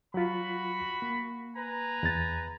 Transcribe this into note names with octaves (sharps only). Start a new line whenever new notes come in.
F#3 F4 F#4 B5
A#3
B4 G#5 A#5
E2 A6